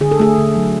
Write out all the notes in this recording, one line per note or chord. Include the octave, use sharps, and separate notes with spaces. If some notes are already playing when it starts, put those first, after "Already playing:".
D3 G#4
A4
A3 G#4
D3
F#3